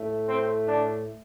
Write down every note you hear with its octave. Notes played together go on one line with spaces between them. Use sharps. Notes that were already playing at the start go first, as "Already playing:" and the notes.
Already playing: A2 A3
C4
D4